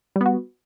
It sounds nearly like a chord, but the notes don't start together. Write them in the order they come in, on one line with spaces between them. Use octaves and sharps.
G3 B3 F#4